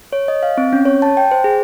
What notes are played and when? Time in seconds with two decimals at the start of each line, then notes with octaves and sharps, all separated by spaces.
0.13 C#5
0.28 D#5
0.43 F5
0.58 C4
0.73 C#4
0.85 C#5
1.02 A5
1.17 G5
1.31 C5
1.44 G#4